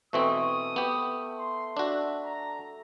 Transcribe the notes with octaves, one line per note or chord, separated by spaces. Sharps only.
B2 E3 A3 C4 D#6
B3 G4
C6
D4 F#4 E5
A#5